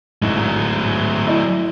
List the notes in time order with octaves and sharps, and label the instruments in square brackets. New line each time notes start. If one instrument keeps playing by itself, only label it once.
[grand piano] A1 G#2 [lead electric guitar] F#3 A3
[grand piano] E4 D5 D#5